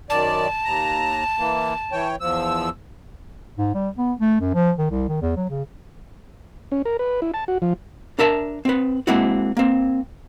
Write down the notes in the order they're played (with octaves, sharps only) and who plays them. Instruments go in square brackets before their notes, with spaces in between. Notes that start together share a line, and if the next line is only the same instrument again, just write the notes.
[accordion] F#2 D#3 D5 [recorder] A5
[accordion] D#2 A#5
E3 A#3
E3 C#5 G5
E2 F3 E6
[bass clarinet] G#2
G3
B3
A3
F#2
F3
D#3
C2
D#3
E2
F#3
C#3
[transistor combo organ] C#4
A#4
B4
E4
A5
F#4
F3
[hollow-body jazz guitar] D4 A#4 E5 A5
C4 B4
G#3 A#3 C4 E4 F#4
A#3 C4